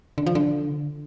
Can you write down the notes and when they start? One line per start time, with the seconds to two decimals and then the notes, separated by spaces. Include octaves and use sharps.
0.18 D3
0.26 F3
0.35 D3